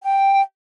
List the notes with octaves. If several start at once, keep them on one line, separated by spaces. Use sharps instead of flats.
G5